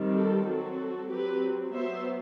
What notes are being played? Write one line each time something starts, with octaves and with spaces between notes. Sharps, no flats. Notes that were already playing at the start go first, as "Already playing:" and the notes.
Already playing: D#3 G3 C4
F#4 A4
F#3 C4 F#4 A4
F#3 C4 G4 B4
F#3 B3 C5 E5